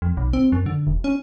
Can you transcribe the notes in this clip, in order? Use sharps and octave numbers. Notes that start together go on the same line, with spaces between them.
F2
B1
C4
F#2
D3
E1
C#4